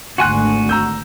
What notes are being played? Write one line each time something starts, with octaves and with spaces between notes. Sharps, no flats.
G#1 D2 F#4 G#5 C6 F#6
A#5 E6 G6